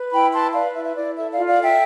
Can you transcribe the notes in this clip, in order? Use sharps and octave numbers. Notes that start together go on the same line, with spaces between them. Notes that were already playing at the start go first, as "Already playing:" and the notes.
Already playing: B4
E4 G5 B5
B4 A5 C6
B4 D5 F5
E4 E5
E5
E4 D5
A4 E5
D5 F5
F4
D5 F5
A4
E5 G5